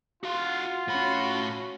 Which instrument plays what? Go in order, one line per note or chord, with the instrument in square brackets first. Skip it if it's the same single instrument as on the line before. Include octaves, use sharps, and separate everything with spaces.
[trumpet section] F4 F#5 [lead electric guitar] F#4 F5
[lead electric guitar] A2 B5 [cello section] C#4 F#4